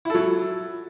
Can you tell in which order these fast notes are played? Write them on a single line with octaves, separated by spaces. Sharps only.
E4 A4 F#3